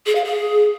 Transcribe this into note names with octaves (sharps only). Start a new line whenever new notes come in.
G#4
F5
G#4